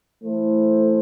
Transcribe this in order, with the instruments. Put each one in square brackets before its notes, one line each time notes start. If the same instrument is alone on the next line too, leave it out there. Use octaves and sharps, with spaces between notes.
[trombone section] E3 A3 E4 A4 C5